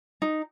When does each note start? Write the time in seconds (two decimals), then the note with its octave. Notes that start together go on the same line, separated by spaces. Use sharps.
0.22 D#4